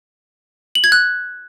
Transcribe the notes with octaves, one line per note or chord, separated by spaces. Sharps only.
F#7
G#6
F#6